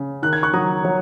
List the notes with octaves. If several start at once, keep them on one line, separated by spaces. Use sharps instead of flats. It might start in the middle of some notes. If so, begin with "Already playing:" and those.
Already playing: C#3
D#3 F#6
G#6
C#6 F#6
F#3 A#5 D#6
F#3 C#5